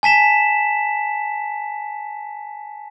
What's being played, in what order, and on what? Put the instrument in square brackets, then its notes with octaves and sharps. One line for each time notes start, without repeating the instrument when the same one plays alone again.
[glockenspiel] G#5 A5 B6 E7